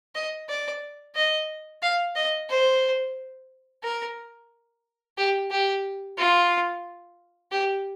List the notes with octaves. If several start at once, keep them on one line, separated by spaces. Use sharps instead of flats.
D#5
D5
D#5
F5
D#5
C5
A#4
G4
G4
F4
G4